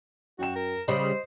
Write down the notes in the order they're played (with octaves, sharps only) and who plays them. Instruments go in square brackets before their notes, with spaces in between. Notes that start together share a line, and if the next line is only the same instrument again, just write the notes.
[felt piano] F#2 G5 E7 [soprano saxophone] F#4
[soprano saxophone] A#4
[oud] C#3 G3 [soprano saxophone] C5 [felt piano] D#5